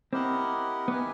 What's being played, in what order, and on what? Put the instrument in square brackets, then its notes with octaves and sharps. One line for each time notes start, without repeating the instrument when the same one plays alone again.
[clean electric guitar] C4 [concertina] E4 G4 A#4 D#5 F#5
[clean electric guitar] B3 [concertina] D#4 G4 B4 E5 G#5